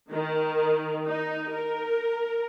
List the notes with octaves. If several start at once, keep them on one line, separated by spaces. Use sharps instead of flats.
D#3
D#4
A#4